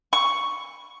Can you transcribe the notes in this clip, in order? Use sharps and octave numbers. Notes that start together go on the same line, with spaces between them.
C#6